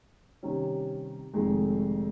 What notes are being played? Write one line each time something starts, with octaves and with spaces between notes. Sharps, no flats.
C3 D#3 G3 C#4
F1 F2 D#3 G#3